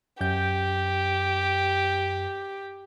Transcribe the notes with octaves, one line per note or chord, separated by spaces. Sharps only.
F#2 G4 G6